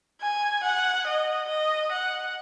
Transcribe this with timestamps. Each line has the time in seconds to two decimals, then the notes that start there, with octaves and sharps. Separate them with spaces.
0.21 G#5
0.63 F#5
1.07 D#5
1.49 D#5
1.92 F#5